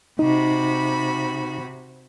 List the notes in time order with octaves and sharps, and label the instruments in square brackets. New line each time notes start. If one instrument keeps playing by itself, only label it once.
[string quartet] C3 F#4 B5 [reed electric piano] D#4